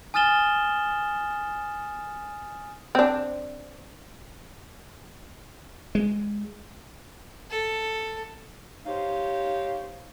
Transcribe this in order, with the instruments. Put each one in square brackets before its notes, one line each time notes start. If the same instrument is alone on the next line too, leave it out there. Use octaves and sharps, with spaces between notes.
[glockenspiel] G#5 D#6 F6 A6 E7 G7
[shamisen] C4 D4
[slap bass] G#3
[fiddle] A4
[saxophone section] D#4 G4 C5 C#5 F5